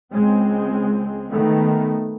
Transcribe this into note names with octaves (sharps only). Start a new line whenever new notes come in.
C#2 G#3 C4
D#3 A3 B3